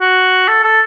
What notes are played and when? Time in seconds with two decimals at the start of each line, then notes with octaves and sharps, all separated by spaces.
0.01 F#4
0.48 A4
0.63 A4